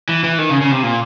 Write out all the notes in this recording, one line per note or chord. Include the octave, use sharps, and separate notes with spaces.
E3
E3
D#3
C#3
C#3
C3
A#2